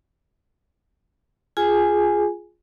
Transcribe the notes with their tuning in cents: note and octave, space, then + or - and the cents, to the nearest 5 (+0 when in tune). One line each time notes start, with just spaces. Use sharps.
F4 +0 G#4 +0 G#5 +0